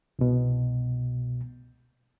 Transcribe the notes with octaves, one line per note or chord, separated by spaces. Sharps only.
C2 B2